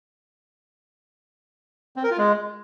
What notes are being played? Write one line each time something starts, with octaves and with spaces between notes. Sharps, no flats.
C4
A#4
F4
G#3